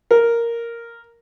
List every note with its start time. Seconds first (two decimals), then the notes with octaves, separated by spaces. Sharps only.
0.11 A#4